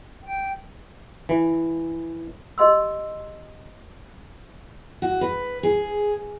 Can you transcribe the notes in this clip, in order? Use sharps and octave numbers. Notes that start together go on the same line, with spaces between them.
G5
E3
G4 D#5 C6 E6
F#4
B4
G#4